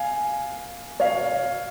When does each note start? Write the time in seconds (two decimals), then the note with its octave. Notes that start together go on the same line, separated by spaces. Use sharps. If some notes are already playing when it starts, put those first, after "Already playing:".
Already playing: F5 G#5
1.00 C#5 F5